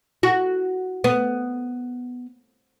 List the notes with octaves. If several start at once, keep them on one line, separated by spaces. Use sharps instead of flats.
F#4
B3